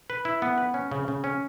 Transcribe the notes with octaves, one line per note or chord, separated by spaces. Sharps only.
B4
E4
B3
B4
C#4
C#3
C#3
C#4